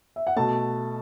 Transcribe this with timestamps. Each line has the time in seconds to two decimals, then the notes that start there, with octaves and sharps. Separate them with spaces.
0.16 E5
0.27 F#5
0.36 B2 A3 A5